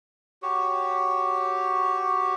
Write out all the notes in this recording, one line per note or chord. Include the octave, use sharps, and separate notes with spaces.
F#4 G4 C#5